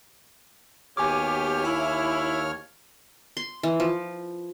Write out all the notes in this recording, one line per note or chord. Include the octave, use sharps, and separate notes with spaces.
D#2 B3 F#4 G4 C#5 G#5 D6 F6
E4
C6
E3
F3